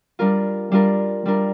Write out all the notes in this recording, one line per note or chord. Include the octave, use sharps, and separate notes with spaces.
G3 D4 F4 A#4
G3 D4 F4 A#4
G3 D4 F4 A#4